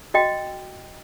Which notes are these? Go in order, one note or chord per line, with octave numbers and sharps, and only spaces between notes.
F#4 D#5 G5